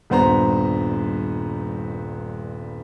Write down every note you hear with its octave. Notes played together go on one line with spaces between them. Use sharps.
D#1 G2 B3 C5 A#5